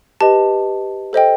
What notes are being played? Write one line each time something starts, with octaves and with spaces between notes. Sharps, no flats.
G4 B4 D#5 A5
A4 C5 D#5 G5